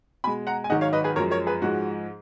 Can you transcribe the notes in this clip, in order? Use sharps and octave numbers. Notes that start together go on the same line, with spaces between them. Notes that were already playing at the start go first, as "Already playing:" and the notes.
B2 G#3 G#5 B5
F#5 A#5
G#5
G#2 D#3 F#3 D#5 F#5
C#5 F5
B4 D#5
G#4 B4
F#2 F3 G#3 A#4 C#5
A#4 C#5
G#4 B4
G#2 F3 G#3 F#4